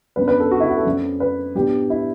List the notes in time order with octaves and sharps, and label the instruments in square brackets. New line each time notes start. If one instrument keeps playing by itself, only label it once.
[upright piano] F#2 F#3 B3 D4 B4
B4
A4
F#4
E4
F#4
A4
F#2 F#3 A3 C4
B4
A2 F#3 B3 D4 G4
E4